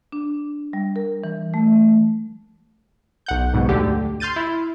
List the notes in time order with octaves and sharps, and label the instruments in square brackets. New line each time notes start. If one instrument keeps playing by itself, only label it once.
[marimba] D4
G3
A#4
E3
A3
[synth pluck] B1 F#5 G6
B1 G#2 B2
D2 D3 G4
C6 F6 G6 A6 D#7
E4